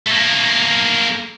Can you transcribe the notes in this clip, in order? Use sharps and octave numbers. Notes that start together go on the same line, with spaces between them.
A3 A#3